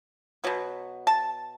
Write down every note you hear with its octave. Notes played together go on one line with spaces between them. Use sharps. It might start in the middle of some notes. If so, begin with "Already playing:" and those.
B2 F#3 B3
A5